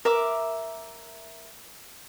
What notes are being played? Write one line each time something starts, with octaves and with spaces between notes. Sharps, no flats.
A#4 E5 D6